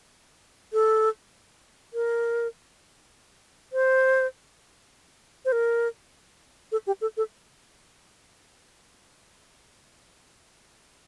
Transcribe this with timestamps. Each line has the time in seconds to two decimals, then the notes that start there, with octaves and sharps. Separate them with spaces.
0.73 A4
1.94 A#4
3.73 C5
5.45 C5
5.52 A#4
6.72 A4
6.87 G4
7.01 A4
7.17 A4